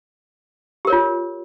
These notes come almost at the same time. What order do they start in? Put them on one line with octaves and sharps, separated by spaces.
G4 A#4 C#5 F4